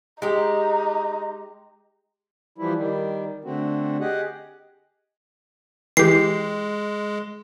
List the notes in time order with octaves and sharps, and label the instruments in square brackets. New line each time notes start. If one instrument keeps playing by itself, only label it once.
[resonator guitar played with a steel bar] G#3 G4 [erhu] D#4
[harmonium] E3 F3 G3 E4
D#3 G3
D3 A3 C4 F#4
G4 G#4 D#5 F#5
[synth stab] E3 G4 [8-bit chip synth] G#3 [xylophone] C7